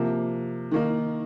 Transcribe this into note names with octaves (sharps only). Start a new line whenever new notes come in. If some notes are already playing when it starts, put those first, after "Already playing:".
Already playing: C3 F3 A#3
D#3 A#3 D#4